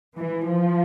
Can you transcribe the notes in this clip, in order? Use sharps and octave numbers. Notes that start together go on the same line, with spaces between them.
E3
F3